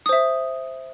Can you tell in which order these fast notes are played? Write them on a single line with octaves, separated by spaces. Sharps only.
D#6 C5 E5